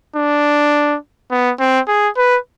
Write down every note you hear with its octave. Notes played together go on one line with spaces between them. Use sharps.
D4
B3
C4
G#4
B4